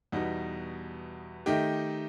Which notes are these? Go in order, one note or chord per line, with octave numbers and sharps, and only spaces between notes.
E2 B2 G3 D#4 F#4
D#3 A3 D#4 G4